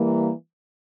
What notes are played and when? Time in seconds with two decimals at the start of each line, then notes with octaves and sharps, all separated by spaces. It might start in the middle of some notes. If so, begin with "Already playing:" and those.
Already playing: E3 G3 A#3